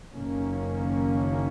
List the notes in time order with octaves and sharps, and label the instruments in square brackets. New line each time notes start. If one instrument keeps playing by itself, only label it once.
[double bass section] F#1 F#2 D#3 A#3 C#4